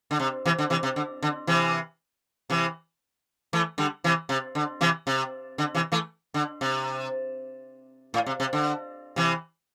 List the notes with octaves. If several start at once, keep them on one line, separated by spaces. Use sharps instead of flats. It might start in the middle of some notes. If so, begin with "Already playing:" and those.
D3
C3
C3 E3
D3
C3 E3
C3
D3
D3
C3 E3
C3 E3
E3 A3
D3 G3
C3 E3
C3
D3
C3 E3
C3
D3
C3 E3
E3 A3
D3
C3
A2
C3
C3
D3
C3 E3